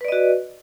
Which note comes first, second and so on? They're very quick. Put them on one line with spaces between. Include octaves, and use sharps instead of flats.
B4 D5 D#5 F#4